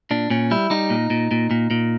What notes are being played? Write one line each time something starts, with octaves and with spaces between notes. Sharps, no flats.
A#2 D4
A#2 C#4
G3 E4
G3 D#4
A#2
A#2
A#2
A#2
A#2